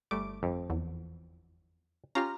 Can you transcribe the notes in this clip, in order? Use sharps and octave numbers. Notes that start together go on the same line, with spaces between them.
G1 G3 A3 D6
F2
E2
C#4 F4 G4 A#5 F6